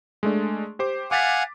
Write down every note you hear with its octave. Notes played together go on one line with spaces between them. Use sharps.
G#3 A3 D4
G4 C5 D6
F5 F#5 G#5 D6 A6 B6